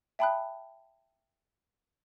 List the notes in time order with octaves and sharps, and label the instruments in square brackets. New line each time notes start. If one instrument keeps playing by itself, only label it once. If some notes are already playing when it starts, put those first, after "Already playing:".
[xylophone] E5 G5 A5 B5 D#6 F#6